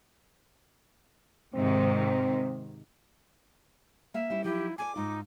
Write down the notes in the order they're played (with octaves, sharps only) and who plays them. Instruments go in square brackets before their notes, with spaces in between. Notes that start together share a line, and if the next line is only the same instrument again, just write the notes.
[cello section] G#2 C3 D#3 [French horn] C4
[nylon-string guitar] A#3 F5 [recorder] E5
[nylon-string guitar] G3 C#4 E4
[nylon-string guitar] F3 F#3 D#4 [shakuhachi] E4 [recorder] G4
[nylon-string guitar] F4 A4 D5 [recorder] G#5 [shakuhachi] D6
[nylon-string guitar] G#2 F4 [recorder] D#4